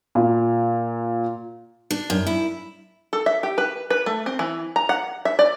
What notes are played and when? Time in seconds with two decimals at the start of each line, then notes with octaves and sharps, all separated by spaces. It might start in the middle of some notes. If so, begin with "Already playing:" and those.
0.15 A#2
1.91 D4
2.10 F#2
2.27 E4
3.13 A4
3.26 E5
3.43 G4
3.58 B4
3.90 B4
4.06 A3
4.26 C4
4.39 E3
4.76 A#5
4.89 F#5
5.25 E5
5.39 D5